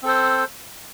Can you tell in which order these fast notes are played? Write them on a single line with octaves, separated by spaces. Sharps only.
C4 A4 C5